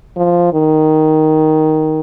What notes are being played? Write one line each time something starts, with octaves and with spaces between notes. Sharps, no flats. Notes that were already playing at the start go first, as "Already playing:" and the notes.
F3
D#3